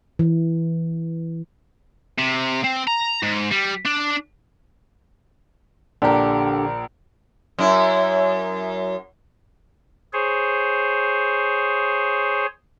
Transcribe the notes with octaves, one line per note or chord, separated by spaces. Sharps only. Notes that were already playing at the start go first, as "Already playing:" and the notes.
E3
C3
C4
A#5
G#2
G3
D4
A#1 D3 D4 G4 A#4
F#2 E4
G#4 C5 C#5